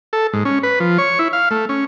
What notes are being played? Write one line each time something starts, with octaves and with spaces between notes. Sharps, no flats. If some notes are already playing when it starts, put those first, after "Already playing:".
A4
G#2
C#4
B4
F3
C#5
E4
F5
A3
C#4